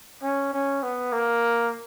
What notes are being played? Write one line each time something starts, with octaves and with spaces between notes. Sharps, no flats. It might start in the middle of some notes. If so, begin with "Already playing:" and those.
C#4
C#4
B3
A#3